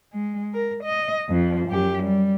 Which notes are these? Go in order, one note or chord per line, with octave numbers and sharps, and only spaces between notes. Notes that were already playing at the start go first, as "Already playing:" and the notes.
G#3
A#4
D#5
F2 F3
F#2 G4
G3